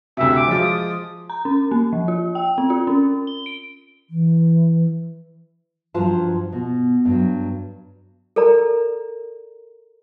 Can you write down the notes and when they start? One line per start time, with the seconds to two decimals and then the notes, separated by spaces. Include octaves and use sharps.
0.17 D2 C3 E5
0.35 D6
0.47 F3 G#3 F4
0.61 D#6
1.30 A#5
1.45 C#4
1.71 A#3
1.93 F3
2.08 F4
2.35 G5
2.58 C4
2.70 F4
2.87 C#4
3.27 G7
3.46 D7
4.10 E3
5.94 G2 F3 F#3 F4 C5 A5
6.52 B2
7.05 G2 F#3
8.36 A4 A#4 D5 A#5